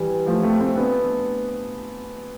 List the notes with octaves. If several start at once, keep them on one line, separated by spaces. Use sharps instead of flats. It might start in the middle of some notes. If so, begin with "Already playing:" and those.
Already playing: E3 G3
F3 A3
A3 C4
A3 C4
B3 D4